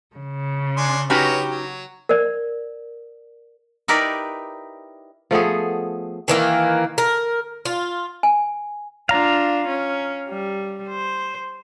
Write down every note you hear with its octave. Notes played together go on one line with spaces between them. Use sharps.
C#3
D4 G#5 C6
F#3 C#4 D#4 F#4 G4 B4 C#5
F#3
A#4 D5
D#4 E4 G4 A#4 B4 D5
F3 A3 B3 G#4
D#3 E3 A#3
A#4
F4
G#5
D4 F4 F5 A#5
C#4
G3
C5